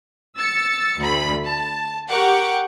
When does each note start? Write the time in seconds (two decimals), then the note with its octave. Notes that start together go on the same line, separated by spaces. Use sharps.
0.36 E6 A6 C#7
0.97 D2 B5
1.44 A5
2.09 G4 A#4 F#5 G5 C#6 D6